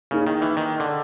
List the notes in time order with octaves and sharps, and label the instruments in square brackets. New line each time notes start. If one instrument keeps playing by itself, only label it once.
[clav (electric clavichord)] C#3 [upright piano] A#3 D#4 G#4
[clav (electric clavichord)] D#3
E3
D#3
D3